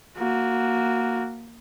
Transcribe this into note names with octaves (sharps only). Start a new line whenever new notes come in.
A#3 F#4